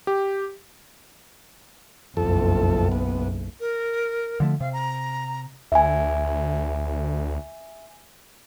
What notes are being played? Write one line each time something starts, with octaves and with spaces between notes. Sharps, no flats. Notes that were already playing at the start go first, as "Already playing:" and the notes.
G4
F#1 B1 F2 A4
B3
A#4
D3 F3 A3
C3 F5
A#5
D2 E5 G#5